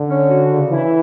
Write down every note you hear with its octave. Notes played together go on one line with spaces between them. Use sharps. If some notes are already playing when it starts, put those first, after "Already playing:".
Already playing: D3
C#4
F#4
C#3
E3 E4